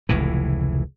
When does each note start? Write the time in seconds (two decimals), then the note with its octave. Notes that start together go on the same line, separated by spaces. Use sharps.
0.09 F1 C#2 A2 E3